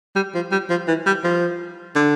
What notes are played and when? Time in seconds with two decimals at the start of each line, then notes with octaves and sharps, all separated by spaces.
0.16 G3
0.35 F3
0.52 G3
0.70 F3
0.88 E3
1.06 G3
1.24 F3
1.96 D3